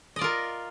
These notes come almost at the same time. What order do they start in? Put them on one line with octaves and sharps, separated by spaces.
D#5 D5 F4 A#4